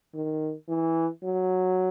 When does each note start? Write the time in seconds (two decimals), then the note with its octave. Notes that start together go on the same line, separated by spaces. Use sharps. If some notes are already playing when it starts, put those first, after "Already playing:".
0.15 D#3
0.69 E3
1.24 F#3